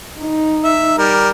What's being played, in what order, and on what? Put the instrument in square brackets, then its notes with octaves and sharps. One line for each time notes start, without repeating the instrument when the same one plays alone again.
[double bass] D#4
[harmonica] E5
G3 A#4